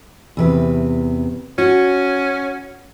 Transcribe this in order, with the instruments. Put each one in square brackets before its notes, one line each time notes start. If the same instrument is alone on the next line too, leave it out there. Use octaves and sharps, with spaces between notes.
[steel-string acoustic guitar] E2 C3 B4
[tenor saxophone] C#4 [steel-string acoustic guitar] F#4